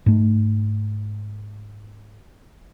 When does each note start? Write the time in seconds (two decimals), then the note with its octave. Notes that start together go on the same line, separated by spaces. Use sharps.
0.06 G#2 A3